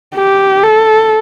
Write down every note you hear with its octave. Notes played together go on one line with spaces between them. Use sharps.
G4
A4